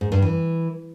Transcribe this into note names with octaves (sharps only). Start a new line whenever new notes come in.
G#2
G2
E3